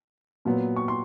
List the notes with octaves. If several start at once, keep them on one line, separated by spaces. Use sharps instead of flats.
A#2 F#3 B3
C#6
C6